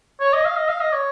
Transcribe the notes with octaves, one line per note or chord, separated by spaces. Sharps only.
C#5
D#5
F5
D#5
F5
D#5
C#5